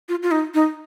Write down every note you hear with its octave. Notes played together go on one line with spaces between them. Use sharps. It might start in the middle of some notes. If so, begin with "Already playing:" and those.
F4
F4
D#4
D#4